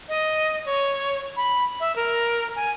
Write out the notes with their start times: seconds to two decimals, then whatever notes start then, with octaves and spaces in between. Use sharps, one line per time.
0.09 D#5
0.66 C#5
1.37 B5
1.80 E5
1.96 A#4
2.56 G#5